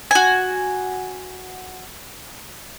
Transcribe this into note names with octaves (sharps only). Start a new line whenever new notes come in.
F#4 G#5